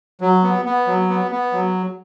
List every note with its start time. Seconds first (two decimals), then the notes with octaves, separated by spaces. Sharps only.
0.21 F#3
0.43 B3
0.65 B3
0.87 F#3
1.10 B3
1.31 B3
1.53 F#3